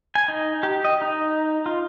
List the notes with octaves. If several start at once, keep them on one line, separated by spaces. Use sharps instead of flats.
G#5
D#4
G4
D#5
D#4
F4